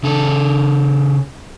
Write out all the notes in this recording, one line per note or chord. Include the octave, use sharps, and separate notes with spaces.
C#3 A4